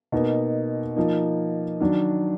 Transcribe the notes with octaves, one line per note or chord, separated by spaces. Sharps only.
B2 A#3 D#4
F3 A#3 D#4
D#3 F#3 D4